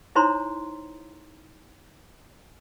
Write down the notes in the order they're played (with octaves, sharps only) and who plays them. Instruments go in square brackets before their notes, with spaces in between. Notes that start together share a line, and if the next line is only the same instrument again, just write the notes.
[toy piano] D#4 E4 C5 C#5 A#5 C6